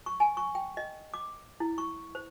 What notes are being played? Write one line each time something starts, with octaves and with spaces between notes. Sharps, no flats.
C#6
G#5
C#6
G5
D#5
D6
E4
C#6
C5